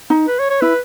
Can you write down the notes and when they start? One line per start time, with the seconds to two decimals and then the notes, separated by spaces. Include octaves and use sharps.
0.10 D#4
0.28 B4
0.39 C#5
0.50 C#5
0.61 E4 B4